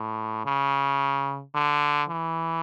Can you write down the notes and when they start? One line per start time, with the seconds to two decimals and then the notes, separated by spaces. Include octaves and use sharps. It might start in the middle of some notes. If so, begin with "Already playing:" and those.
Already playing: A2
0.45 C#3
1.54 D3
2.09 E3